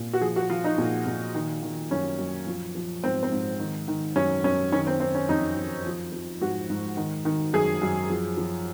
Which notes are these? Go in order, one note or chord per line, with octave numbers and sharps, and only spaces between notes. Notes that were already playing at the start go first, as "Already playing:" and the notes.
Already playing: A#2
F#4
F3 G#4
F#4
F3 F4
D#4
A#2
A#2
D#3
D#3
F#2 C#4
F#2
F3
F3
G#2 C4
C4
G#2
D#3
D#3
F#2 C#4
F#2 C#4
D#3 C#4
C4
D#3 C4
C#4
F2 D#4
F2
F3
F3
G#2 F#4
G#2
D#3
D#3
F#2 G#4
F#2
F3
F3